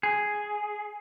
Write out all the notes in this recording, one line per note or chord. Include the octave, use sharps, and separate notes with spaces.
G#4